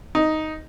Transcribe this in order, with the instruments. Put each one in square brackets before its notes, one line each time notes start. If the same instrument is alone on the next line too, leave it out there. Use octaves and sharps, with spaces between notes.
[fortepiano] D#4